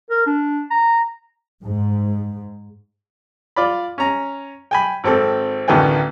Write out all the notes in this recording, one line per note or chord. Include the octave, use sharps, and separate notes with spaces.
A#4
D4
A#5
G#2
F4 D5 B5
C#4 A#5
G5 G#5 B5
G#1 C4 A4
A1 D2 D#3 B3 G5 G#5